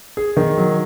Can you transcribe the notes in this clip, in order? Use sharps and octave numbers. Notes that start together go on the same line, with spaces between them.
G#4
D#3
F#3